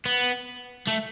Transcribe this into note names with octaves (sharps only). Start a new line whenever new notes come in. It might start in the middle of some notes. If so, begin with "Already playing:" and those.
B3
A3